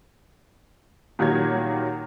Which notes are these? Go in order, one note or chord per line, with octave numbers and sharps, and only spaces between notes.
A#2 D#3 F#3 G3 G#6